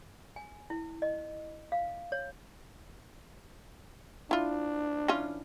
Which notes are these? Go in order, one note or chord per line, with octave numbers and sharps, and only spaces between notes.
G#5
E4
D#5
F5
C#5
D4 E4 F4
E3 C#4 F4